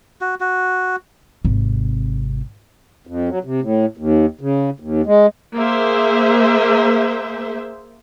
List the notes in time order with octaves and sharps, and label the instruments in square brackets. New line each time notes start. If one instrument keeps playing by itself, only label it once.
[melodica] F#4
F#4
[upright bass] G#1 C3
[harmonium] F2
F#3
C3
A2
D#2
C#3
D#2
G#3
[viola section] A#3 G#4 C5 E5